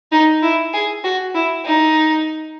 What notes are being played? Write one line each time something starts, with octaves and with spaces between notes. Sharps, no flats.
D#4
E4
G#4
F#4
E4
D#4